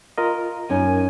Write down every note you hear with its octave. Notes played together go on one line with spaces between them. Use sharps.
F4 A#4 D#5
F#2 C#4 D#4 G#5